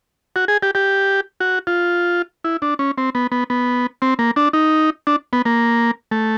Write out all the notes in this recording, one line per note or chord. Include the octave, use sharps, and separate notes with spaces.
F#4
G#4
G4
G4
F#4
F4
E4
D4
C#4
C4
B3
B3
B3
C4
A#3
D4
D#4
D4
B3
A#3
A3